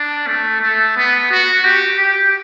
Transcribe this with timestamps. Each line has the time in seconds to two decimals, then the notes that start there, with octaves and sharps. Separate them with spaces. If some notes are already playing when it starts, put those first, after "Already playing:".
Already playing: D4
0.27 A3
0.61 A3
0.97 B3
1.31 F#4
1.65 G4
2.00 G4